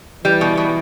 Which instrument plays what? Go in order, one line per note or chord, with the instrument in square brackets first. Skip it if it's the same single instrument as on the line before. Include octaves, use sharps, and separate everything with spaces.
[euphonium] E3 [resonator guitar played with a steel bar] G3
[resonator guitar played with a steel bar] B2
B2